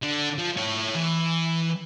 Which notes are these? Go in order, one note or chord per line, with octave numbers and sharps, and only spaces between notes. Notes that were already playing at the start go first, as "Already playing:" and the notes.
D3
F3
E4 C#5
E3